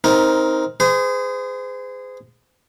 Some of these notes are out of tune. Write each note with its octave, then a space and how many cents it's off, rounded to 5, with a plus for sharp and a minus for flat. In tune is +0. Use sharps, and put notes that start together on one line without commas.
C4 +0 D#4 +20 A#4 +0
G#4 -10 C5 -40